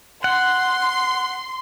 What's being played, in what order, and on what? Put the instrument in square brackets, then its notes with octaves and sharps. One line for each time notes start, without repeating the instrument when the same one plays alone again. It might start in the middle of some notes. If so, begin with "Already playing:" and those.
[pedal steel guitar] F#5 [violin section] C6